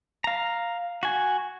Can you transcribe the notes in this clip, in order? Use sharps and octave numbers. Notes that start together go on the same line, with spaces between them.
F5 A#5
F#4 G#5